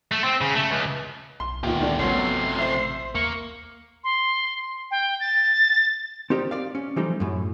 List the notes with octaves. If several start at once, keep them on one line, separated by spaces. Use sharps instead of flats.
A3
C4
C#3
A3
C#2
B1 C6
C#2 A#2 D#3 B3 G4
D2 D#3 A3 D4
A1 C3 F#3 A3 B3 C#4 C6
C5 E5
D#2 A#3 C#6
C6
G5
A6
C4 D#4 G4 A#4 D5
D5 F5
C#4
E3 F3 G3 A3 D#4
F#2 A2